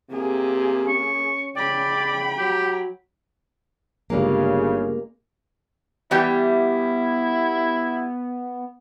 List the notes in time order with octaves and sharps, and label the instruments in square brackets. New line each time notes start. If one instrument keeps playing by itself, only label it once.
[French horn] C3 [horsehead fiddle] A#3 G#4
[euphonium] C#4 [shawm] C#6
[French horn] C#3 [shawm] D5 [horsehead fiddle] G5 B5
[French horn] F#3 [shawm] G4
[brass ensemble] G1 C#3 [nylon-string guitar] G3 G#3 A#3
[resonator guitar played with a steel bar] E3 G3 G4 [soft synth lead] B3 [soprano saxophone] E4